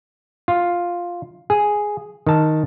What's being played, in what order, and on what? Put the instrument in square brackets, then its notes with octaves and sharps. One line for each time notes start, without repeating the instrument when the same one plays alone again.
[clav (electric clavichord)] F4
G#4
D#3 A5